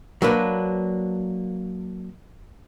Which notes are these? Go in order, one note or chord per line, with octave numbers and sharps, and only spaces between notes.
F#3 A#3 D4 B4